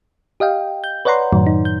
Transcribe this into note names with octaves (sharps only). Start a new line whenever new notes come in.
G4 D#5 F5 G5
G6
B4 C#5 D5 F#5 A#5 C6
F#2 A2 D#3 F#3
D#4
G6